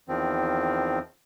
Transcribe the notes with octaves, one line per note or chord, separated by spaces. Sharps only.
E2 D#3 F3 C4